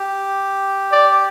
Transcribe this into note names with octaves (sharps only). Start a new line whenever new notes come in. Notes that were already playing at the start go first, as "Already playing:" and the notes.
Already playing: G4
D5